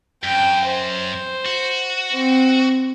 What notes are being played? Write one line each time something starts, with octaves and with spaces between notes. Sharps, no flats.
F#2 G5
C5
F#4
C4